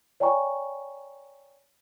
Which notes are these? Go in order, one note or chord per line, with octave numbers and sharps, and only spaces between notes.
C#5 D5 G5 G#5 A#5 C#6